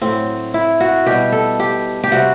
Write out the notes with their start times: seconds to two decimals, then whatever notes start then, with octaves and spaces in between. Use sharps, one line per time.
0.02 A2 F#3 C4
0.54 E4
0.80 F#4
1.06 B2 G3 G4
1.32 A4
1.59 G4
2.04 G4
2.12 C3 G3 F#4